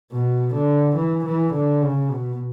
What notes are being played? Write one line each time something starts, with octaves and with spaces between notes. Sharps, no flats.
B2
D3
E3
E3
D3
C#3
B2